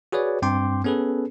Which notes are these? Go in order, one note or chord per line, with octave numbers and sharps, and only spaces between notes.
F#4 G#4 B4 C#5 D5
G2 C4 G5 C6 D6
B3 C#4 G#4 A4 B4